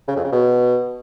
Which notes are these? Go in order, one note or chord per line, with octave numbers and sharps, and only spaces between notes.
C#3
F2
C#3
B2